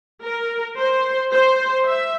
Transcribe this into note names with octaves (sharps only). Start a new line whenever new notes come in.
A#4
C5
C5
E5